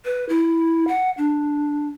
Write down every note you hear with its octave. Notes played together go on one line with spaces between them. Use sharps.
B4
E4
F#5
D4